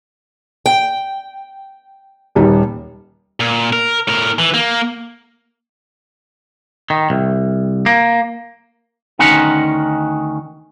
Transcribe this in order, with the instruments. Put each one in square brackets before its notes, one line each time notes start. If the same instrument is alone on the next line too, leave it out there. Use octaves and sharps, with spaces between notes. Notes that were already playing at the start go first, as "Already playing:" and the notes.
[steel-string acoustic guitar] G5
[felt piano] D#1 G3 D#4
[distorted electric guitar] A#2
A#4
A2 A#4
E3
A#3
[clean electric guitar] D#3
C2
A#3
D2 D#3 C#4 D#4 F#5 C6